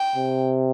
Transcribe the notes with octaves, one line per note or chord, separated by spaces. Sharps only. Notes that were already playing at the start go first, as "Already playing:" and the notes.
Already playing: G5
C3